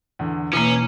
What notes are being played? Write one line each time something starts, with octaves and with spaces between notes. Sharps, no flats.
E2 D3
B2 E3 A#3 C#4